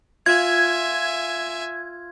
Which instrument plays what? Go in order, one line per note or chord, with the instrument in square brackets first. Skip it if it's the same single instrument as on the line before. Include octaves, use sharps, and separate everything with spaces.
[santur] F4 [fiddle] E5 G#5 [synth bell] G#6